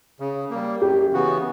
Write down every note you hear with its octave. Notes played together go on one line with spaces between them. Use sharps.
C#3
G3 A#3
F#2 G4
C#3 E3 B3 F#4